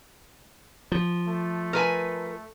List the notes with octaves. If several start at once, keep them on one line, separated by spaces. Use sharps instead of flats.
F3
A3
A#4 B4 G#5